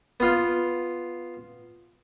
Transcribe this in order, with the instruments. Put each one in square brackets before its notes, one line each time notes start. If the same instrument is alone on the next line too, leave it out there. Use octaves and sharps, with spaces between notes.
[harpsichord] B3 F4